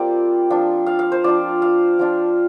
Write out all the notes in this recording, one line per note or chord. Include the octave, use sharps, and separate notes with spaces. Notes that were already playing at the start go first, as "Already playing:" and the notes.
Already playing: G3 A#3 C4 F4 D5 G5
F3 D4 F4
F5
F5
C5
F3 D4 F4 D5
F5
F3 D4 F4